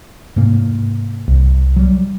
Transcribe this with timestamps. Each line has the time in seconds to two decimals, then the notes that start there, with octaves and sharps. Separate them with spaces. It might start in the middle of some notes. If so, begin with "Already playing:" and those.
0.36 G#2 C3 A#3
1.28 C2
1.76 F#3 G3